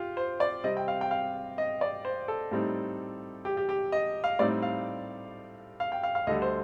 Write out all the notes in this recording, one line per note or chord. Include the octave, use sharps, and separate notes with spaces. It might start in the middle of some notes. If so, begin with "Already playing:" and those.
Already playing: F4 G4
C5
D5
C3 G3 C4 D#5
G5
F5
G5
F5
D#5
D5
C5
A4
A2 G3 C4 D#4
G4
G4
G4
D#5
F5
A2 G3 C4 D#4 D5
F5
F5
G5
F5
F5
D2 D3 G3 D#5
C5